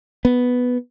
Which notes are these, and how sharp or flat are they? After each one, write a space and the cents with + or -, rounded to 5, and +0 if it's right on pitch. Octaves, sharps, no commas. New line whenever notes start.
B3 +0